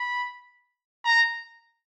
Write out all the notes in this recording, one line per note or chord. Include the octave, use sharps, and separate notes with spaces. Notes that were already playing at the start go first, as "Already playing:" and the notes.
Already playing: B5
A#5